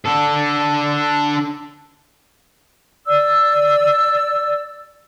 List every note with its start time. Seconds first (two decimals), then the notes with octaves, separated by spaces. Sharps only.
0.06 D4 A4
3.07 D5 E6